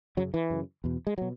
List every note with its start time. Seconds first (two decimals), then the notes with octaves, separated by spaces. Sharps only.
0.17 F#2 C#3 F#3
0.34 E3
0.50 F#2 C#3
0.84 E2 B2
1.07 G#3
1.18 B2 F#3